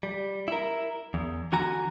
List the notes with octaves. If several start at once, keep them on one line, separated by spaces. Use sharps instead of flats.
G3
E4 A#4
E2
D3 E3 F#4 G#5 A#5